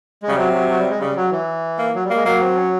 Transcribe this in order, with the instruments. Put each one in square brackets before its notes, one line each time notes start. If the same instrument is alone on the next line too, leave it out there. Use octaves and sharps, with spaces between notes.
[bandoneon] G#3
[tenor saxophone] C#3 [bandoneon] G3
[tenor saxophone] C3 [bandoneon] F#3
[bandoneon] F#3
F#3
G3
G#3
[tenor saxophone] C#3 [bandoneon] G3
[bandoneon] F#3
E3
[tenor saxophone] A#3
[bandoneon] F#3
G3
[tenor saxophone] A#3
[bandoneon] G#3
[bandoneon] F#3 [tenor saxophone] A#3
[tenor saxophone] C4
C#4